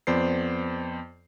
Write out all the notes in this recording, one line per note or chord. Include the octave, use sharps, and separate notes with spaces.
F2 B3 C5 D5 C7